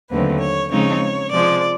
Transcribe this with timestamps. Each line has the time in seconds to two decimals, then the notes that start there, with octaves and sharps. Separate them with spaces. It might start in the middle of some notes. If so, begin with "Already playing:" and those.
0.11 D#2 D3 F#3 A3 C4 B4
0.41 C#5
0.71 C#3 F3 G#3 C4 D#4 C#5
1.32 C3 F3 G#3 D5